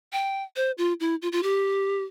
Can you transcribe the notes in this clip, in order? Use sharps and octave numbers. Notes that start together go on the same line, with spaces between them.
G5
C5
F4
E4
F4
F4
G4